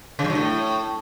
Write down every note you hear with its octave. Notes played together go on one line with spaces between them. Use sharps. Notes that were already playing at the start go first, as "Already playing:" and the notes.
C#3
G2
F#3
A2